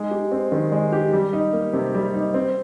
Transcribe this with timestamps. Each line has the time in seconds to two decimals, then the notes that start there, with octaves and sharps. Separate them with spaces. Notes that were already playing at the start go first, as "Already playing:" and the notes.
Already playing: G#3 D#4
0.11 G4
0.32 C4
0.52 D#3
0.72 G#3
0.92 G4
1.13 G3
1.33 D#4
1.53 A#3
1.73 C3
1.95 G3
2.14 D#4
2.34 C4